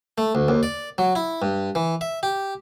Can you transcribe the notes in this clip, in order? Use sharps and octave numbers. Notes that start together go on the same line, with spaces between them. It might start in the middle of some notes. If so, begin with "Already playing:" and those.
A3
D2
D#2
D5
F#3
E4
G2
E3
E5
G4